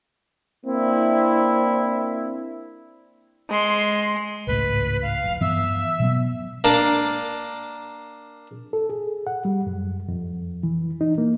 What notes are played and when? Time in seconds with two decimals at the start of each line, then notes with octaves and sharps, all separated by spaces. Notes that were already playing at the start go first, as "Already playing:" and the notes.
0.66 A#3 C4 D4 E4
3.50 G#3 C6
4.47 G#1 C#2 A2 B4
5.02 F5
5.24 F1
5.41 G2 E3 B3 E5
6.00 B2 F#3 B3
6.64 A#3 D4 A5
8.73 A4
8.90 G#4
9.27 F#5
9.45 G3
9.67 F#2
10.08 F2
10.63 E3
11.01 D#4
11.18 A#3